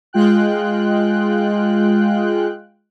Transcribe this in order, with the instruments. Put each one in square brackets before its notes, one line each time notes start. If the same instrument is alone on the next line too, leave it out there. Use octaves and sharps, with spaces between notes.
[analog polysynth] G#3 F4 G5 F#6